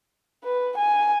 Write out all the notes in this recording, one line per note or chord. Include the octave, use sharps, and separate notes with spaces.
B4
G#5